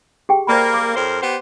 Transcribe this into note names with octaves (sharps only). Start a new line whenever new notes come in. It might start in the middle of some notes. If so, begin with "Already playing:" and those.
G4 G#4 G5
A#3 C5 D5 B5
D6
F2 A#4 C5 C#5
B3 G4 C5